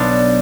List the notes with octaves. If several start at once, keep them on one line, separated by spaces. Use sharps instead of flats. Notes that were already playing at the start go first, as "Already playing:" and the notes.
Already playing: B1 B3 D4